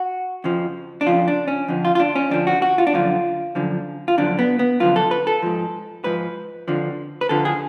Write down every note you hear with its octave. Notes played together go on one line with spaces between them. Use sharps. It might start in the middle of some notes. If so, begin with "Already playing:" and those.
Already playing: F#4
F2 C#3 F3
D4
F2 C#3 F3 F4
D4
C#4
F2 D3 F3
F4
F4
D4
C#4
F2 D3 F3 D4
F#4
F#4
F4
D4
F#2 D3 F3 F4
F#2 D3 F3
F4
F#2 D3 F3 D4
B3
B3
F#2 D3 F3 F4
A4
B4
A4
G#2 F3
G#2 F3 B4
F2 D3 F3
B4
F2 D3 F3 A4
G#4